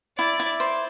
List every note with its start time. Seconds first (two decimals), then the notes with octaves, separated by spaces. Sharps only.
0.18 E4 D5
0.40 E4
0.60 C5